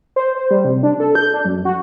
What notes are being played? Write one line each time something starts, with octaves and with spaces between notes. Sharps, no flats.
C5
C5
G3
C3
D4
A4
G6
D4
F#2
F#4